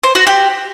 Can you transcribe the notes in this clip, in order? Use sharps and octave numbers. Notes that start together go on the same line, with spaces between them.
C5
F#4
G4